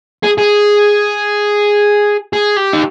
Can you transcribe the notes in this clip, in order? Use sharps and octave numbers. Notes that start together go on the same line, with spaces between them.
G#4
G#4
G#4
G4
D#4